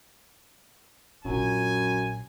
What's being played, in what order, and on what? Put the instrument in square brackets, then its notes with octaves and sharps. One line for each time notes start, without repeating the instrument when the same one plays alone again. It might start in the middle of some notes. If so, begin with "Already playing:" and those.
[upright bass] A#1 F4 [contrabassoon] F#2 [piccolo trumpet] G#5